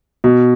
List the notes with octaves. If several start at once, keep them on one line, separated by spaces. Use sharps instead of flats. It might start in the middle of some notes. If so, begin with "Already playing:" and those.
B2